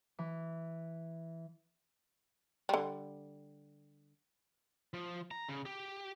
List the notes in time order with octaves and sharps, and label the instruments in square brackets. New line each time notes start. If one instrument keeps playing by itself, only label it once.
[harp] E3
[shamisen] D3 G3
[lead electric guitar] F3
A#5
C#3
G4